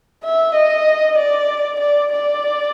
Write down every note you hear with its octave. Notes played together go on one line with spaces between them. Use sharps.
E5
D#5
D5
D5
D5